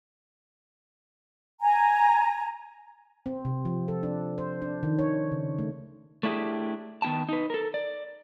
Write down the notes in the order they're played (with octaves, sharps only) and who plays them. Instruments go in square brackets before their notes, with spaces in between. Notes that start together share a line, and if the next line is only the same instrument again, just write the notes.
[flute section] G#5 A#5
[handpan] C4
C3
F3
A4
D4
C5
D4
D#3
C#5
C#3
A3
[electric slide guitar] A3 D4 E4 G4 G#4
D#3 B3 E4 G5 A5
D#4 B4
A4 A#4
D5